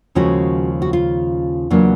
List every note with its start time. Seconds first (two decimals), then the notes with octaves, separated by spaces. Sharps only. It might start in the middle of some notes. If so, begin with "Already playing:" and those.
0.15 D#2 C#3 F3 G#3 C#4 F#4
0.82 F#4
0.93 F4
1.70 E2 C#3 F#3 A#3 D4